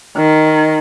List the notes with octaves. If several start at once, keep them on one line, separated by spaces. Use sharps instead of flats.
D#3